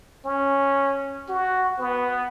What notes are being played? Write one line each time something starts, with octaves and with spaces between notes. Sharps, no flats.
C#4
F#4
B3